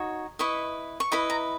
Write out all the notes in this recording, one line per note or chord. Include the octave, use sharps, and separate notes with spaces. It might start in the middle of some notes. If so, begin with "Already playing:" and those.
Already playing: D#4 F#4 C#5
E4 B4 D#5 C#6
C#6
E4 B4 D#5 B5
A#5